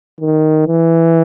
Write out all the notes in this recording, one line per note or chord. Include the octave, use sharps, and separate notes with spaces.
D#3
E3